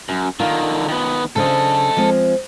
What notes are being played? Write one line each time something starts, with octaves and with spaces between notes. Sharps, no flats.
F#2
D3 D#3 F4
D#3 B3
C#3 D4 A4 C5 D#5
F3 G#3 C4